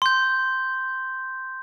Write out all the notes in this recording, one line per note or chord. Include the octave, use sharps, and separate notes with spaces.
C6 G6